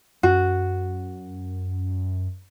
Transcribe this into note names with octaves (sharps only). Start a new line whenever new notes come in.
F#2 F#4